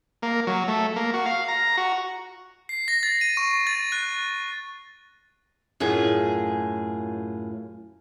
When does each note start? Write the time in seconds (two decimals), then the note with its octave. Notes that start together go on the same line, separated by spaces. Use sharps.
0.22 A#3
0.47 F#3
0.68 A3
0.96 A#3
1.14 F#4
1.26 F5
1.48 A#5
1.77 F#4
2.69 C7
2.88 A#6
3.03 A6
3.21 D#7
3.37 C#6
3.67 A6
3.92 F#6
5.80 F#2 A2 F4 G#4